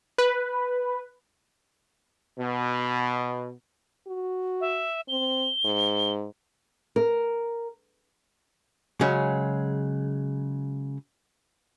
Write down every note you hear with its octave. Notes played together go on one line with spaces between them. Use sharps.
B4
B2
F#4
E5
C4 G7
G#2
A#4
C#3 F#3 G#3